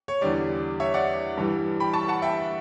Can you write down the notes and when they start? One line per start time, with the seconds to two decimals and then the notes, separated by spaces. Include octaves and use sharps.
0.08 C#5
0.21 E2 D3 G3 D5
0.80 C#5 E5
0.94 D5 F#5
1.37 G2 E3 G3
1.80 G5 B5
1.94 A5 C#6
2.08 F#5 A5
2.22 E5 G5